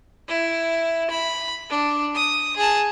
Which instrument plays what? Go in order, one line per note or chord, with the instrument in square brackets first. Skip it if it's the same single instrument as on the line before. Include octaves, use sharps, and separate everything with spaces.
[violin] E4
B5
D4
D#6
G#4 A5